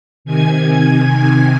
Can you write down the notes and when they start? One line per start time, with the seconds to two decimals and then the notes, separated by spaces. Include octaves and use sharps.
0.25 C3 D#3 G#5 G#6